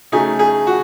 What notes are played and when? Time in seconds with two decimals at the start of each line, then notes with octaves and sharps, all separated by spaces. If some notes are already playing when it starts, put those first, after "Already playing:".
0.12 C#3 F#3 A3 D#4 G#4
0.39 G#4
0.67 F#4